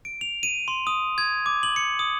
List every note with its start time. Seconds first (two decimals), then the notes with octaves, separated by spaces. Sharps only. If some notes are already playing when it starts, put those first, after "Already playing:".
0.05 D7
0.21 F7
0.43 D#7
0.68 C6
0.87 D#6
1.18 G#6
1.46 D6
1.63 F#7
1.76 C#7
1.99 D#6